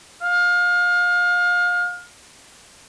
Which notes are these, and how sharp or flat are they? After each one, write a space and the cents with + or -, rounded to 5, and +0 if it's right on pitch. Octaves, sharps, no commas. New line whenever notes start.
F5 +30